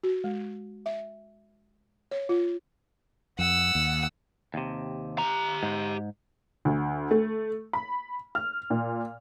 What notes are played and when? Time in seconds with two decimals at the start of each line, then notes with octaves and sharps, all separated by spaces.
0.03 F#4
0.24 G#3
0.86 E5
2.11 C#5
2.29 F4
3.39 F2 F#5 E6
3.75 D#2
4.54 D#2 C3
5.18 G4 A#5
5.63 G#2
6.65 D2
7.11 A3
7.73 B5
8.35 F6
8.70 A#2